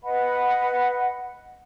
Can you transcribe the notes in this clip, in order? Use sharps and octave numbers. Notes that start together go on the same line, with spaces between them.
B4 D#5 F#5 B5